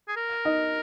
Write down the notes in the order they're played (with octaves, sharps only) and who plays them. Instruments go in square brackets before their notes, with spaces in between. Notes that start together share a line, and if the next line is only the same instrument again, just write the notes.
[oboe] G#4
A#4
[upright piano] D#4 D#5